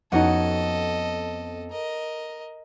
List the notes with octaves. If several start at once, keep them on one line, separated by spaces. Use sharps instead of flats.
F2 B3 C#4 D#4 F#4 A4 D#5 F#5
A#4 D#5